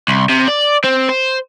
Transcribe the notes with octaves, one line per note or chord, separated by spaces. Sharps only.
C2
C3
D5
C4
C5